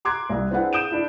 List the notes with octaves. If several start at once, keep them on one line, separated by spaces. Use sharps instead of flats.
A#5 C6 D6 F#6 G#6
C2
C4 D4 E4 G#4 B4 F#5
D#6 G6 D7 E7
D4 E4